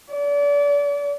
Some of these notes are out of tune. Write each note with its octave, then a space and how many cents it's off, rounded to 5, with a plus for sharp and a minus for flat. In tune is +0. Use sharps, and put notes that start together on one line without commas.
D5 -35